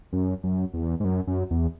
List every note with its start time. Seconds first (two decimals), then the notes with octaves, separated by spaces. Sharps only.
0.13 F#2
0.44 F#2
0.74 E2
1.00 G#2
1.05 F#2
1.27 F#2
1.51 E2